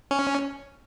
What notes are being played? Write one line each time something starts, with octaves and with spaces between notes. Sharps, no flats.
C#4